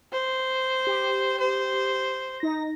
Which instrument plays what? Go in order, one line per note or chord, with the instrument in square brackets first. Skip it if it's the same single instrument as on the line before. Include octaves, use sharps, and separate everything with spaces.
[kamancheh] C5
[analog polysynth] G4
[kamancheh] C5
[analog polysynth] D#4 A#6